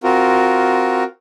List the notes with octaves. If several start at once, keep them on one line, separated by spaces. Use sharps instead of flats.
C4 F4 F#4 A#4